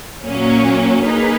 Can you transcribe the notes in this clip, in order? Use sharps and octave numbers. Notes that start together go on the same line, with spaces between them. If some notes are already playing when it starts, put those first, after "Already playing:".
A#2 F#3 A#3 C#4
A#3 D#4 G#4 B4